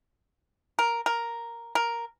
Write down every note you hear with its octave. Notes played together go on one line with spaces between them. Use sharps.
A#4
A#4
A#4